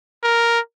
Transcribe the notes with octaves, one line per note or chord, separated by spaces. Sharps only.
A#4